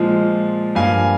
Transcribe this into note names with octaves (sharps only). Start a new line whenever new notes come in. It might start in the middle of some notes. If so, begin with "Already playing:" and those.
Already playing: A#2 F3 G#3
G2 F3 A#3 F5 G#5